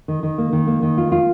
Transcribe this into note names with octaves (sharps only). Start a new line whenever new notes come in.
D#3
D#3
A#3
D#3
A#3
D#3
F4
F4